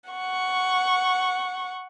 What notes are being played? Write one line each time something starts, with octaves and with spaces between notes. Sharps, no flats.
F#5 C#6